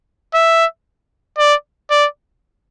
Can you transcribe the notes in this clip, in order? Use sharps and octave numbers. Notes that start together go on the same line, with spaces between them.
E5
D5
D5